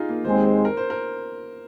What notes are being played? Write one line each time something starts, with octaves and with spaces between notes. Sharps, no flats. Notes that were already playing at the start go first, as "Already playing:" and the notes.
Already playing: D#4 F4 G#4
A#3
D#2 D#3 G#3 C4 C5
C5
A#4
C5
A#4